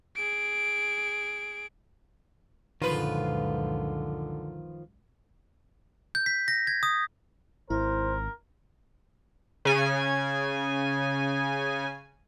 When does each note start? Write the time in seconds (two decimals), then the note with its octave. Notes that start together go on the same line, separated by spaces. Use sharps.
0.16 G#4 D7
2.82 C#2 F#2 A#2 D3 D#3 F3 F4 B4
6.15 G6
6.26 B6
6.48 A#6
6.67 G#6
6.83 D#6
7.70 G#1 E4 A#4 C5
9.65 C#3 G#5